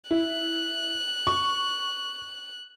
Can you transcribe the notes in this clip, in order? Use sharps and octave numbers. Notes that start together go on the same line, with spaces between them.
E4 F#6
C#6